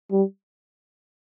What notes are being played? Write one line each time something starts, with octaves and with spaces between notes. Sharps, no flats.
G3